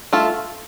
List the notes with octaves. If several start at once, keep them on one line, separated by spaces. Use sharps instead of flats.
A3 F4 A4